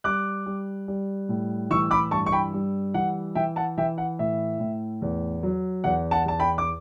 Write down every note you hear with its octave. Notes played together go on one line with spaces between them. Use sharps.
G3 D6 F#6
G3
G3
A2
E3 C#6 E6
B5 D6
G2 A5 C#6
C#6
G5 B5
G3
E3 F#5
E3 E5 G5
F#5 A5
E3 E5 G5
F#5
A2 E5
A2
E2
F#3
E2 F#5
F#5 A5
E2 A5
G5 B5
D6